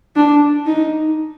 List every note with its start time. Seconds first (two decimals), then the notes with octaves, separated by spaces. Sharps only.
0.16 D4
0.66 D#4